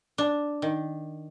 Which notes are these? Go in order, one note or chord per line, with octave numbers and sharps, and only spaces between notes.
D4
D#3